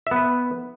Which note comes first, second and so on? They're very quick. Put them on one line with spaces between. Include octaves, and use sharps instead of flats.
E5 B3 B4